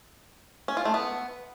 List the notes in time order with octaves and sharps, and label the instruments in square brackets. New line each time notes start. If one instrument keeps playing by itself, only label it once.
[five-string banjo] C#4
F4
A3
B3